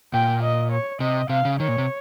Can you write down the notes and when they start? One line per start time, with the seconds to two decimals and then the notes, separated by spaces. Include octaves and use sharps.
0.13 A#2 G5
0.43 D#5
0.72 C#5
1.00 C3 D#5
1.30 C3 F5
1.45 C#3
1.60 D#3 C#5
1.68 A#2
1.78 C3